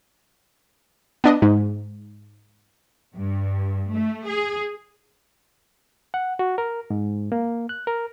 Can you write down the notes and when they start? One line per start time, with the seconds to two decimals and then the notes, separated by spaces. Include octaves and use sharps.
1.24 B3 D4 D#5
1.42 G#2
3.14 G2
3.91 A3
4.26 G#4
6.14 F#5
6.39 F#4
6.58 A#4
6.90 G#2
7.32 A#3
7.69 F#6
7.87 A#4